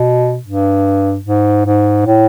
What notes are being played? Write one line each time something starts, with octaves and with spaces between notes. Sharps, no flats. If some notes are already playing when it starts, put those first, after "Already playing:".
Already playing: B2
G2
G#2
G#2
A2